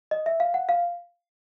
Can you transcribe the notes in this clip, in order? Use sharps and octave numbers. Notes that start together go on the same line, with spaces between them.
D#5
E5
F5
F#5
F5